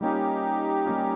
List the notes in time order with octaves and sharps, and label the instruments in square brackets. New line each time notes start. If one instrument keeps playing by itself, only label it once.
[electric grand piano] G3 A#3 C#4 F4 [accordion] D#4 G4
[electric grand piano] G3 A#3 C#4 F4